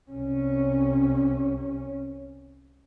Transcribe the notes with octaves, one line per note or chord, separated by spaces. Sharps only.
C2 C#4